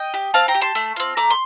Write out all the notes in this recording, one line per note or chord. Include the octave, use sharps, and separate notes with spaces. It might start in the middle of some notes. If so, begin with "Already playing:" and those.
Already playing: D#5 G5
G4
C4 F5 A5
G5 A#5
G4
A5 C6
A3
C4 F4
A3 A#5 D6
C6